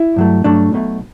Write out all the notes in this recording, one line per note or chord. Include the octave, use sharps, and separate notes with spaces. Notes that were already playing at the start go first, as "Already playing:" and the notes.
Already playing: E4
G2 F#3 A3
G2 F#3 A3 D4
B1 B2 A3